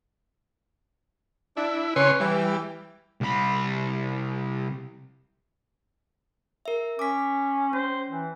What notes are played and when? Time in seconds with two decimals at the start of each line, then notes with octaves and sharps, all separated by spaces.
1.57 D4 E4
1.96 C#3 C#4 B4 C#5 C6
2.20 E3 G3
3.21 C2 B5
6.66 A#4 E5
6.99 C#4 D6 B6
7.73 C#4 C5
8.10 E3